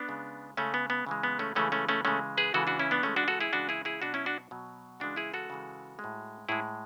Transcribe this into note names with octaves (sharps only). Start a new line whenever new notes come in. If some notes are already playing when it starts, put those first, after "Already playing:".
Already playing: B3 D4
C#3 G#3
C#3 G#3 A3 C#4
B3
B3
C#3 E3 G#3
B3
A3 C#4
C#3 E3 G#3 A3 C#4
A3 C#4
A3 C#4
C#3 E3 G#3 A3 C#4
G#4 B4
C#3 E3 G#3 F#4 A4
D4 F#4
C#4 E4
B3 D4
C#3 E3 G#3 A3 C#4
D4 F#4
F#4 A4
E4 G#4
C#3 E3 G#3 D4 F#4
E4 G#4
E4 G#4
B2 F#3 D4 F#4
C#4 E4
D4 F#4
B2 F#3
C#3 E3 G#3 D4 F#4
E4 G#4
F#4 A4
C#3 E3 G#3
G#3
A2
A2 G#3 E4 G#4